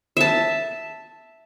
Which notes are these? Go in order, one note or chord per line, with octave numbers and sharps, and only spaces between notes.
E5 A5